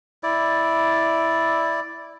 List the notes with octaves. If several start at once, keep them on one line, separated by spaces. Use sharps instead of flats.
E4 D5